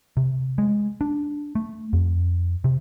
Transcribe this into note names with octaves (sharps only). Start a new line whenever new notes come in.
C3
G#3
D4
A3
F2
C3